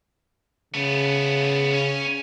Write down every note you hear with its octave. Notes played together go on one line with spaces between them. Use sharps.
C#3 A3 B3
C#4